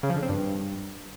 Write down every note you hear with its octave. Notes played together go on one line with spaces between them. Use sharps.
C#3
F3
D3
C4
G2